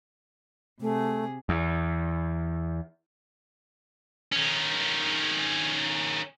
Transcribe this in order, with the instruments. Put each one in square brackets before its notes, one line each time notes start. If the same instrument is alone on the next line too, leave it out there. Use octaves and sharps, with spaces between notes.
[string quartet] C3 G#4 [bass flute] A3
[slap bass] E2
[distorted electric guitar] D#3 C#4